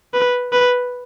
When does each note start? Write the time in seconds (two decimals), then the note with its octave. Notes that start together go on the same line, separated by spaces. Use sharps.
0.14 B4
0.52 B4